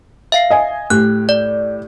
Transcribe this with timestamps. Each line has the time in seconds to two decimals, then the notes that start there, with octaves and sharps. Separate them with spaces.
0.32 E5 F5 C7
0.50 D#5 G#5
0.90 A2 G4 F#6
1.29 D5